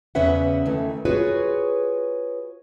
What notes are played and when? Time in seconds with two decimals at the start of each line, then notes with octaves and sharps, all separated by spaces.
0.15 E2 C#3 C#4 B4 E5 F#5
0.66 D#3 E3 A3
1.05 F4 F#4 G#4 B4 C#5